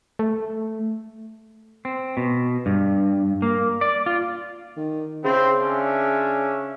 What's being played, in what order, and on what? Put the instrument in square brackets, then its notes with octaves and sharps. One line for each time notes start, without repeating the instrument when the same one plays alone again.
[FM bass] A3
[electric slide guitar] C4
B2
G2
A#3
D5
F4
[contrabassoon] D#3
[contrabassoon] C#3 [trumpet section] C4 E4 C5
[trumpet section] C#4 D4 E5